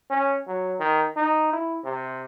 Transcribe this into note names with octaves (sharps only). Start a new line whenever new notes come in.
C#4
F#3
D#3
D#4
E4
C3